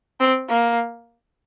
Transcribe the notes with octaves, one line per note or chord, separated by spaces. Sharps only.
C4
A#3